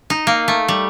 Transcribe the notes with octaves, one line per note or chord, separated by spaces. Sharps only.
D#4
A#3
A3
G3